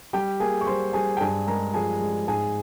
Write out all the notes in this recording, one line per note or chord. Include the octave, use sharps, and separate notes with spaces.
G3 G4 G5
A#3 G#4 G#5
C#6
G3 C5 C6
G3 G#4 G#5
G5
G2 G#4 G#5
G#3 A#4 A#5
F3 G#4 G#5
G#3
G#2 G#4 G#5